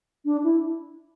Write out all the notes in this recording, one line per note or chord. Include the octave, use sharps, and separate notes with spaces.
D4
E4